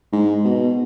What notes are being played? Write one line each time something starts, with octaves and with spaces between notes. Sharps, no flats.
G#2
B2